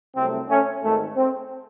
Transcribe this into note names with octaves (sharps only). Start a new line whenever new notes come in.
C2 C3 F#3 A3 C4
A3 C#4
G#1 G#2 D#3 A3
C4